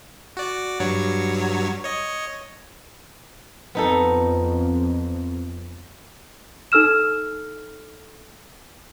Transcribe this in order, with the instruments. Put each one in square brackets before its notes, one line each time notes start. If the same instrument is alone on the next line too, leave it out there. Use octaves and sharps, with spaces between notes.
[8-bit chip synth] F#4 D5
G2 F#3 C#5
C#5 D#5
[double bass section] F2 [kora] B3 D#4 A4
[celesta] D#4 A4 E6 F6 E7